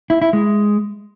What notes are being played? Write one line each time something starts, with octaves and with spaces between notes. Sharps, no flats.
E4
E4
G#3